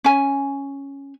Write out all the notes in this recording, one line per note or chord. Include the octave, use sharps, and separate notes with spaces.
C#4 G#5